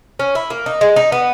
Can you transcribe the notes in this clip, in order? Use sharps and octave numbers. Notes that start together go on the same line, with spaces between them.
C#4
E4
A#3
D#4
G#3
D#4
B3